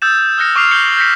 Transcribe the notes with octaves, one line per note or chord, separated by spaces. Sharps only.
D#6 E6 G6 A6 E7
D#6 F6 F#6 A#6 C#7
C#6 D6 F6 C7 F7
G6 C#7 F#7 G7
G6 A#6 B6 C#7